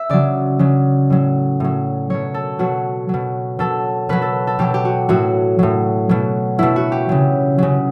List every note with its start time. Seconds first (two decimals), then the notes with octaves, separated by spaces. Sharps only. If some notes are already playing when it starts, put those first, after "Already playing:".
Already playing: E5
0.09 C#3 F#3 D5
0.59 C#3 F#3
1.10 A2 F#3
1.60 A2 F#3
2.10 B2 F#3 C#5
2.34 A4
2.59 B2 F#3 F#4
3.09 B2 F#3
3.59 B2 F#3 A4
4.09 B2 F#3 B4
4.22 A4
4.47 A4
4.59 B2 F#3 G4
4.74 G4
4.85 F#4
5.09 A2 F#3 F#4
5.59 A2 F#3
6.09 B2 F#3
6.59 B2 F#3 E4
6.76 F#4
6.92 G4
7.09 C#3 F#3
7.58 C#3 F#3